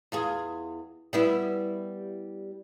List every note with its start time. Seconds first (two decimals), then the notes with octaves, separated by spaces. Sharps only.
0.12 E2 F4 G#4
1.13 G3 B3 E4